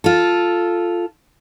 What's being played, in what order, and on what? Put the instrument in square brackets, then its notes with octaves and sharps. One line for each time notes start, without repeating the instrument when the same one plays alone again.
[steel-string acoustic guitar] F4 A4